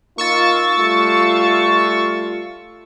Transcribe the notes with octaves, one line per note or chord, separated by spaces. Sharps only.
A#3 D#4 F4 C#6 E6 A6
G3 A3 F4